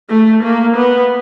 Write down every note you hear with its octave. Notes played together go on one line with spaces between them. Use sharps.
A3
A#3
B3